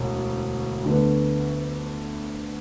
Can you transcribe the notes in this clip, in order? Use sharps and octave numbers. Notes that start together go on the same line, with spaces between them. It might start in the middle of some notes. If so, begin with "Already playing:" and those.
Already playing: E1 D2
D2 D3 B3